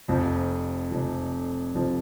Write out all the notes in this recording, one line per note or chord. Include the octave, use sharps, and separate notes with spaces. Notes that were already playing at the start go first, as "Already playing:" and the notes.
F1 F2 F3
F1 F2 F3
F1 F2 F3